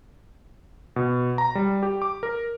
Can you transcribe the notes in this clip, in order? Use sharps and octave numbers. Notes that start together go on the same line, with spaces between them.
B2
A#5
G3
G4
D6
A#4